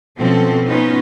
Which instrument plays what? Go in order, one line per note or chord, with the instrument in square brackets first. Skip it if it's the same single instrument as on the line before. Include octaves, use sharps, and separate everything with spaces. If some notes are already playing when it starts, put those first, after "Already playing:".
[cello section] B2 F3 C4 C#4 A4
B3 C#4 D#4 F4 B4